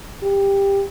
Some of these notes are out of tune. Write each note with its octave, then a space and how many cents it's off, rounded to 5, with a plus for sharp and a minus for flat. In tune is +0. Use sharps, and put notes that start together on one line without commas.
G4 +15